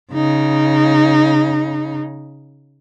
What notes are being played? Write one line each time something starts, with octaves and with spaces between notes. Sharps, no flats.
C#3 D#4